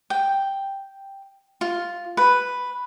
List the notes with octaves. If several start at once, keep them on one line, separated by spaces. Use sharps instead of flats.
G5
F4
B4